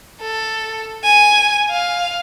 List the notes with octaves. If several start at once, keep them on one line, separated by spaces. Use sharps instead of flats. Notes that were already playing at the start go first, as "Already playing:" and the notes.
A4
G#5
F5